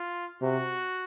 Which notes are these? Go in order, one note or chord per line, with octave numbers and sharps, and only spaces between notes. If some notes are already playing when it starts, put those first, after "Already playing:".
Already playing: F4
C3 F#4